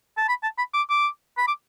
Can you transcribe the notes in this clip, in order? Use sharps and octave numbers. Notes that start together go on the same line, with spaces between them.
A5
B5
A5
B5
D6
D6
B5
D6